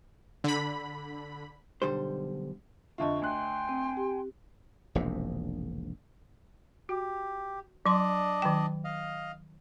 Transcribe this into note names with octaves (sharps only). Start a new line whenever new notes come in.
D3 B5
B1 D3 G3 C5
F2 D3 F4 D#5 E5 C#6
D2 G5 G#5 C6 F#6
C4
G4
E1 A#1 G#2 C3
F#4 G4
F#3 D4 D5 D#5 C6
D#3 F#3 G5
D#5 F5